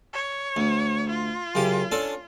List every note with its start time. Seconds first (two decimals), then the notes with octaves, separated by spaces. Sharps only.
0.13 C#5
0.56 D2
1.10 F4
1.55 F#2 C#3 G4
1.92 C#4 D4 A4